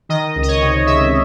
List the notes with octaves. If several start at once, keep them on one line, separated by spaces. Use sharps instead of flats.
D#3 D#5
C#2
D#5
C#5
C3
C#2 E5